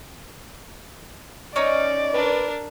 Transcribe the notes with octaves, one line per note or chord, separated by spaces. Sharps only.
C#4 D#4 D5
D4 A#4 B4